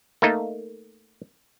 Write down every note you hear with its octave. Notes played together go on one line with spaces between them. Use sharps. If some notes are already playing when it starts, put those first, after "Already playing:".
A3 A#3 D#4